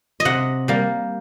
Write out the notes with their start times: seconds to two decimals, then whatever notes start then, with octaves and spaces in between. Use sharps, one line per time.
0.20 D#5
0.25 C3 F#5
0.68 G3 A#3